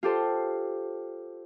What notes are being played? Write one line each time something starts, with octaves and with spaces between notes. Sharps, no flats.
F4 G4 A4 C5